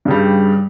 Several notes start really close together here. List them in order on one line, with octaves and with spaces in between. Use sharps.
G2 C#3 G3